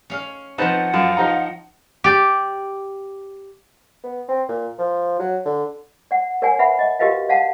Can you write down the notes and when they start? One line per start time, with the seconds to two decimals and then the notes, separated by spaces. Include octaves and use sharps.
0.10 C#4 F5
0.58 F3 C4 D#4 B4 F#5 A5
0.94 F#2 F4 A5
1.17 F3 D#4 A#5
2.04 G4 D5
4.03 B3
4.28 C4
4.48 A#2
4.78 F3
5.19 F#3
5.45 D3
6.11 D5 F#5
6.42 A#4 C#5 D5 F#5 G#5
6.59 B4 E5 F#5 B5
6.79 D#5
6.99 F#4 G4 A#4 B4 D#5 F5
7.29 D5 F5 F#5 A5